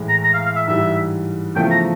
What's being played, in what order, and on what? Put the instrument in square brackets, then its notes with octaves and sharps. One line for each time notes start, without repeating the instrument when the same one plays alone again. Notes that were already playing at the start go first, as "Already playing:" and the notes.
Already playing: [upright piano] A2 E3 G#3
[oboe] A#5
A#5
F5
F5
E5
[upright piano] G#2 E3 G3 [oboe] E5
[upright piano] E2 C#3 F3 A3 [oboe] G5
[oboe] A#5